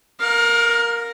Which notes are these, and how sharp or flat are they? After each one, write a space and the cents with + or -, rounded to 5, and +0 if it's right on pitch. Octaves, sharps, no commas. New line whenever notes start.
A#4 +0 F5 +30